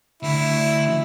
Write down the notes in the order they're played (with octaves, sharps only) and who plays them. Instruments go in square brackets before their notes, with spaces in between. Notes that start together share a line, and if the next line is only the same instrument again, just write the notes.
[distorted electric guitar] D2 [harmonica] E4